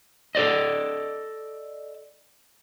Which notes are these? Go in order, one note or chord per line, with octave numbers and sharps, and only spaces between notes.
A4 C5 D5 D#5